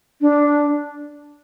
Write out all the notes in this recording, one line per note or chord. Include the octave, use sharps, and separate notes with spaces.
D4